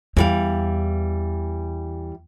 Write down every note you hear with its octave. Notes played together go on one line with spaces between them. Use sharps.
E2 E3 G3 F5